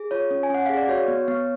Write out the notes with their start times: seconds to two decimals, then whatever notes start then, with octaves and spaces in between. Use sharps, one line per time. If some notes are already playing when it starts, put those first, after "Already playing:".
Already playing: G#4
0.11 F4 C#5
0.31 C#4
0.43 G#5
0.50 C#4 F#5
0.66 G#4 F5
0.77 D5
0.88 F#4 C#5
1.08 B3
1.28 B3